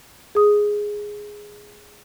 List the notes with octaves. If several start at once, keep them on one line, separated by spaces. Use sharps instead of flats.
G#4 D#6